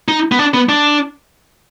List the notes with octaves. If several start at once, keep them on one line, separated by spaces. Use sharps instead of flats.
D#4
B3
D4
B3
D4